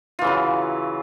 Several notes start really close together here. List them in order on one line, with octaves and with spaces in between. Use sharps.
F4 E3 C#3 F#3